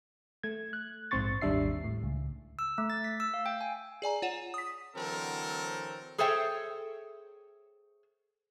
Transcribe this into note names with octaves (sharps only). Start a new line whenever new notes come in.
A3 G#6
F#6
A#1 G#2 C4 C6 C#6 A6
G#1 D#2 G3 D4 E5 C7
A2
C#2
E6
A3
A6
B6
E6
F5
G5
G#5
G#4 D5 G#5 A#5
F4 C#5 F#5 E7
D#6 B6
D3 E3 F#3 C4 A4 A#4
G#4 A4 C5 C#5 E5 G5